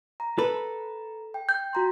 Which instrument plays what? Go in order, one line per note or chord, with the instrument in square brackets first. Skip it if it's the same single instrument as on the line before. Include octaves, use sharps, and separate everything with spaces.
[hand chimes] A#5
[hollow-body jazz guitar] A4 B4
[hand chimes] G5
[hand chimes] G5 [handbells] G6
[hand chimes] F#4 A#5 C6